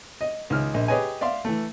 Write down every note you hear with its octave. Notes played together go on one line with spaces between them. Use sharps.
D#5
C#2 D#3 F6
A#1 D#5
G4 G#4 B4 C#5 D#5 G#5
D5 E5 F5 C6
E3 A3